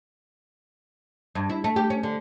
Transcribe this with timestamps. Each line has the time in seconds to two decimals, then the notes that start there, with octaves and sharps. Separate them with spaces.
1.35 G2
1.49 E4
1.64 A3
1.76 G4
1.90 C#4
2.03 D3